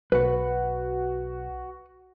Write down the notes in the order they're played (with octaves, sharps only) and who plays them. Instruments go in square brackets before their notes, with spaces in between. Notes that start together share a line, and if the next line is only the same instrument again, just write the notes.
[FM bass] B1 [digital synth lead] F#4 [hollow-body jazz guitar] B4 F#5